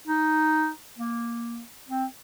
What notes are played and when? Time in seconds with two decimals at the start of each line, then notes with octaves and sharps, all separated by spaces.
0.08 D#4
0.99 A#3
1.89 C4